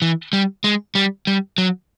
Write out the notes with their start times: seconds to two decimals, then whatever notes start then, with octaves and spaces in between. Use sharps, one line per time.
0.02 E3
0.33 G3
0.64 G#3
0.95 G3
1.27 G3
1.58 F#3